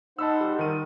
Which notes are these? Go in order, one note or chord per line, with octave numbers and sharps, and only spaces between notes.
D#4 C5 F#5 A5 B5 E6
G3
D#3 A#4 D#7